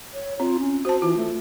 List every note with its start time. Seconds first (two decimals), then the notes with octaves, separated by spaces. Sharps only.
0.14 C#5
0.40 C4 F4
0.59 C#4
0.85 F#4 C5 A5
1.02 E3 F4
1.17 A3